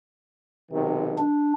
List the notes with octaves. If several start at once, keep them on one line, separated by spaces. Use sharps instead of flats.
B1 C3 D#3
D4